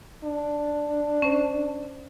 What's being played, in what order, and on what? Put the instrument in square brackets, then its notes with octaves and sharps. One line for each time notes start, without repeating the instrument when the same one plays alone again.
[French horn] D4
[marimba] C#4 C5